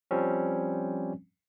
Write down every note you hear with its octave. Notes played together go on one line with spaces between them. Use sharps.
F3 G3 C4 C#4